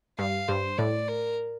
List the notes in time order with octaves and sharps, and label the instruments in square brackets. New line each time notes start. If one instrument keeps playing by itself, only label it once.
[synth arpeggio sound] G2 [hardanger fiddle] F5
[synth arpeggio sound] G2 [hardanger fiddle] C5
[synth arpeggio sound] A2 [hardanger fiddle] D5
[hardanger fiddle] A#4